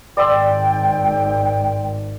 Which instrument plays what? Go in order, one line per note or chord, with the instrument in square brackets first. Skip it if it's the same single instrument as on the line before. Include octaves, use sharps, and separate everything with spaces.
[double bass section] G#1 [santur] D5 C6 E6 [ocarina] G5